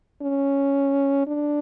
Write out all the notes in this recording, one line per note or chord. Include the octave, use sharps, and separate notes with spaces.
C#4
D4